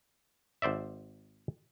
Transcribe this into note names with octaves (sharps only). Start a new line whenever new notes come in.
G#1 C5 D5 E5